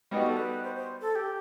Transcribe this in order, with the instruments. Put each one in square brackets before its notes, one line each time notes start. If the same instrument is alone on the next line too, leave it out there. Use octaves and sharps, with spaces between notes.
[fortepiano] G3 B3 D#4 F#4 [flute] D#5
[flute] A4
B4
C5
C5
A4
G4